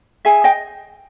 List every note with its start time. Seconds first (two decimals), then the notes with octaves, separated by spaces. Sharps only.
0.25 G#4 E5 G#5
0.44 D#5 G5